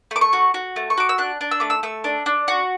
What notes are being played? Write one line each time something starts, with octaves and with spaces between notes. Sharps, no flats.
A3 D6
C#6
F#4
F#4
A3
C#6
F#4 D6
E6
D4 F#6
D4
E6
A3 D6
E6
A3 E6
D4
D4
F#4